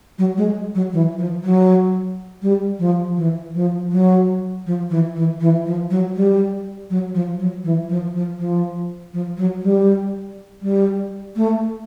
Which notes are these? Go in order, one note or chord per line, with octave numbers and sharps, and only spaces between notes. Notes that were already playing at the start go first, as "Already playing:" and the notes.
F#3
G#3
F#3
E3
F3
F#3
G3
F3
E3
F3
F#3
F3
E3
E3
E3
F3
F#3
G3
F#3
F3
F#3
E3
F3
F3
F3
F3
F#3
G3
G3
A3